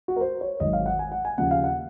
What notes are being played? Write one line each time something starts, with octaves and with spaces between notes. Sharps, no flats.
F#4
A#4
C5
C#5
G#1 G#2 D#3 F#3 D#5
F5
F#5
G#5
F#5
G#5
D#2 C#3 F3 F#5
F5
F#5